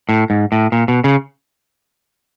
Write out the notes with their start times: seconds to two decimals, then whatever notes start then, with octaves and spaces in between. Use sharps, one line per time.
0.09 A2
0.30 G#2
0.52 A2
0.72 A#2
0.88 B2
1.04 C#3